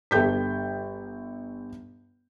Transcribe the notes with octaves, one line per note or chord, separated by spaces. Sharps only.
G1 A4 G5 G6 B6